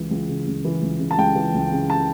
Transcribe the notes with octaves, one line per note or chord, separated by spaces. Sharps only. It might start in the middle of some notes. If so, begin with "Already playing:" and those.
Already playing: C#2 E3
C#2
C#3
C#2
E3
C#2
C#3
A5
C#2 G5
E3
C#2
C#3
A5